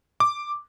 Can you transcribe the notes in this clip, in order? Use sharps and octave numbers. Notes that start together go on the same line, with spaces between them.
D6